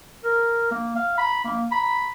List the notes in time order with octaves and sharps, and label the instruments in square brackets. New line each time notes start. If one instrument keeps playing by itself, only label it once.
[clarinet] A#4
A#3
F5
B5
A#3
B5